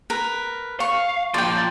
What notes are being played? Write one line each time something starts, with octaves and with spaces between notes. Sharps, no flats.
A#4 B4
F5 C#6
A#2 F3 D5 G5